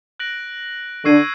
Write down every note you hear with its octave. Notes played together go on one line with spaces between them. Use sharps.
F#6 A#6 D7 F#7
D3 C#6 E6 G#6 C7 D#7